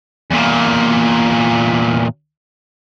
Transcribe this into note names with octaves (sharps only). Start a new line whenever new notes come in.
E2 A#2